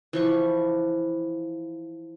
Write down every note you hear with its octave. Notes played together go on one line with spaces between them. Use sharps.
E3 F3 C#6